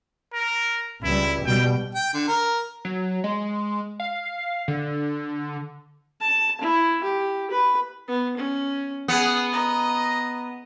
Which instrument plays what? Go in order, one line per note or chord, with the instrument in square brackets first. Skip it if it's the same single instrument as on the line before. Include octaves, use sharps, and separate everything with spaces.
[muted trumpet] A#4
[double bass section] C#2 G3 [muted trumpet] E4
[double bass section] B2 G3 [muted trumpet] G5
[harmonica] G5
D3
A#4
[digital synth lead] F#3
G#3
F5
D3
[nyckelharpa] A5
E4
G4
B4
B3
C#4
[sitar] B3 [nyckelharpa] G#4 F#5
[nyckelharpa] D#5 A#5